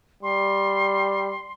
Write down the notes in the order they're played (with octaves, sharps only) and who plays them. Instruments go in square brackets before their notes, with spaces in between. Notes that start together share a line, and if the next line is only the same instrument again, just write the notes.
[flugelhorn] G3 [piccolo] C6